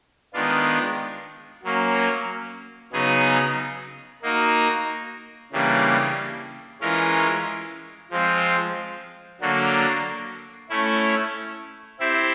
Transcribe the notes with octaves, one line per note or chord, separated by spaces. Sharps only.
D#3 G#3 B3 D4 F4
F#3 A#3 C#4
C#3 F#3 B3 D#4 G#4
A#3 D#4 F#4 A#4
C#3 E3 G3 A#3 D4
E3 G#3 C#4 F4 A#4
F3 G#3 C4 F4
D3 F#3 A#3 D4 F#4
A3 C#4 E4
C4 E4 G4 C5 E5